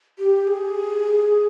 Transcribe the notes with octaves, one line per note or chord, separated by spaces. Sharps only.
G4
G#4